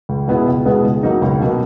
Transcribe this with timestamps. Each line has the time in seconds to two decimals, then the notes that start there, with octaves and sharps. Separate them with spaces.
0.09 C#2
0.27 B2 G#3 B3 E4
0.47 C#2
0.65 B2 G#3 B3 E4
0.84 C#2
1.03 B2 F#3 A#3 D#4
1.22 C#2
1.40 B2 F#3 A#3 D#4